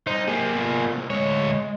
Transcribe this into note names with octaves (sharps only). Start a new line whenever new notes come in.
G3 D#4 C5
A#3 G4 G#4
B3 F4
A2 C3
D2 G#3 C#5